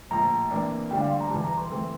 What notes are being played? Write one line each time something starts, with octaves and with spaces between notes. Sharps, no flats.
A#1 A2 F3 A#5
F2 E3 A#3 D4
D2 D3 G3 D4 G5
F5
C6
A#5
E1 E2 E3 G3 A5
A#5
C6
E3 A3 C4